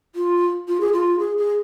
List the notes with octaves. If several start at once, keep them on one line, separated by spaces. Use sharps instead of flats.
F4
F4
G#4
F4
G#4
G#4